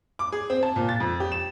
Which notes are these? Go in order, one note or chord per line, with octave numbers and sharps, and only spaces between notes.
D6
G#4
C4
A5
A#2
A6
F2
G4
E7